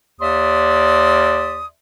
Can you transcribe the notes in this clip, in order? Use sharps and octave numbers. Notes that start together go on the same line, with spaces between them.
D#2 D5 E5 C6 D#6